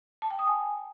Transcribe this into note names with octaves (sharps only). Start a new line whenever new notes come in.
A5
G5
D#6
G#5